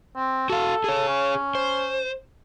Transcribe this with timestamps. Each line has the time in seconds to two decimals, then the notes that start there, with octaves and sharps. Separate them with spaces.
0.16 C4
0.50 F#4 A4 F5
0.84 G#4 C#5
1.08 C#4
1.55 C5